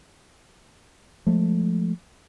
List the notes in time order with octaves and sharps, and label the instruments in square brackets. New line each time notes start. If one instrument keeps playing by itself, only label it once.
[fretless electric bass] F3 G#3 A3